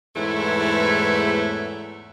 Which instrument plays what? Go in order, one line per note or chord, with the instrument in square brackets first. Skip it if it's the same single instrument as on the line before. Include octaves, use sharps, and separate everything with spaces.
[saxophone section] E2 G#2 A3 E4 B4 C#5